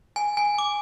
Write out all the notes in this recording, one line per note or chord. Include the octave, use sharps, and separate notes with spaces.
G#5
G#5
D6